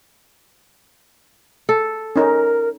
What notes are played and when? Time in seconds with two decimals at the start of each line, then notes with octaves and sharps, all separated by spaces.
1.69 A4
2.16 C#4 D#4 A#4